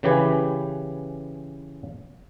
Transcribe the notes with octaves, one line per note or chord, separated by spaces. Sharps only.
C#3 E3 G4 B4 G#5